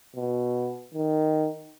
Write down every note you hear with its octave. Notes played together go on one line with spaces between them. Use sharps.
B2
D#3